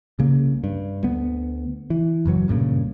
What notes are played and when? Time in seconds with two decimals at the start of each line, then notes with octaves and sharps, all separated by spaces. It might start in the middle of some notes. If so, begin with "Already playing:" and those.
0.19 C2 C#3 A#3
0.64 G2
1.04 D2 B3
1.90 E3
2.26 F#1 F#2 E3 F#3
2.48 C2 G2 A#2 C#3